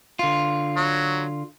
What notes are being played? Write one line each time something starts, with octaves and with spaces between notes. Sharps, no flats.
D3 F4
F#3